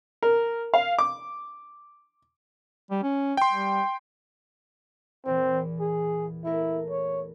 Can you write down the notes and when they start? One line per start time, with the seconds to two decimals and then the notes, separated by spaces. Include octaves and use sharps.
0.22 A#4
0.74 F5
0.99 D6
2.91 G3
3.03 C#4
3.37 G5 C6
3.51 G3
5.25 E2 A#2 E3 C4
5.80 G#4
6.45 A3 B3 E4 A#4
6.90 C#5